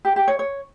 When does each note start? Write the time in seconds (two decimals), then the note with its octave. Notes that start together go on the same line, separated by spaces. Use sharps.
0.05 G4
0.16 G4
0.28 C#5
0.39 C#5